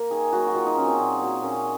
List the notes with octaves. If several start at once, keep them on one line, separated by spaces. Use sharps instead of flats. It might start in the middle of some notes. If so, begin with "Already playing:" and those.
Already playing: A#3 A#4
D#3 G#4
F#3 A#3 F#4
F#4
D#3 F4
D#4
F#3 A#3 C#4
C4
A#2
F#3 A#3
A#2 C#4